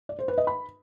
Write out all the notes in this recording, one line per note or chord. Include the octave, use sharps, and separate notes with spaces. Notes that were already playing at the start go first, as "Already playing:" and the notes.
D5
C5
B4
D#5
B5